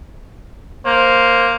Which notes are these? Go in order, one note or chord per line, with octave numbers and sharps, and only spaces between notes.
A#3 C5